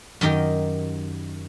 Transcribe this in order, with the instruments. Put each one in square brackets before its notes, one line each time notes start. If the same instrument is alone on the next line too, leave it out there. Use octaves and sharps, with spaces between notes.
[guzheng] F#2 D#3 G4 A#4 D#5